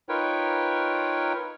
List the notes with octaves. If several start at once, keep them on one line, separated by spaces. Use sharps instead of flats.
D#4 F4 A#4 B4 C#5 G5